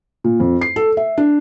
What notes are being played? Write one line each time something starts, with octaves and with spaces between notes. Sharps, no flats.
A#2
F2
C7
A4
E5
D4